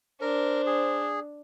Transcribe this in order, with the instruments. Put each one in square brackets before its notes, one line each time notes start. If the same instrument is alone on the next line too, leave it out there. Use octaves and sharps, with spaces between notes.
[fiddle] D4 [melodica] A#4 [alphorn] C5
[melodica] G#4